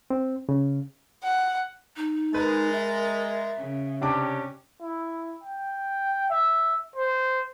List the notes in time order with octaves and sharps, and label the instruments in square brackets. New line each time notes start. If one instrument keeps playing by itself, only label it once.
[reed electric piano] C4
C#3
[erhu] F#5
[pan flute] D#4
[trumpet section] G#3 [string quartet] A#4 A6 [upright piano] B4
[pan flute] E5
[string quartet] C#3
[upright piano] C3 D4 D6 [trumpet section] C#4 G4
[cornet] E4
G5
E5
C5